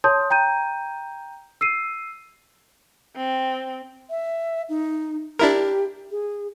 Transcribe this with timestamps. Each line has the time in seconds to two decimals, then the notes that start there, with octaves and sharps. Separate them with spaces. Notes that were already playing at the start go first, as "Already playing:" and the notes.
0.04 C#5 A5 C6 D#6 G6
0.30 G5 A#5 G6 D#7
1.61 E6 C7 D#7
3.16 C4
4.10 E5
4.69 D#4
5.39 D4 E4 G4 A#4
6.11 G#4